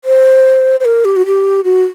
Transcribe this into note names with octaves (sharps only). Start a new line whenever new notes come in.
C5
C5
A#4
G4
F#4
G4
F#4